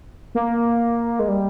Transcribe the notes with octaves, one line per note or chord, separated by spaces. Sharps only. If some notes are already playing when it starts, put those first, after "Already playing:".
A#3
G#3
G3